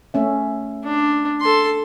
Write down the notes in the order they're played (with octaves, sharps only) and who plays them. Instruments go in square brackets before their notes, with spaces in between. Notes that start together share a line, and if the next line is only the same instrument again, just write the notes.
[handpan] A3 C#4 E5
[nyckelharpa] D4
A4 C6